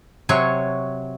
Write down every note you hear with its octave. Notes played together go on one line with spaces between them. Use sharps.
C3 F#3 C#5